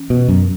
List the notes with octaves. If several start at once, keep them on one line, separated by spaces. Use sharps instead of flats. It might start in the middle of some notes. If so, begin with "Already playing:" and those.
Already playing: E3 C#4
B2
F#2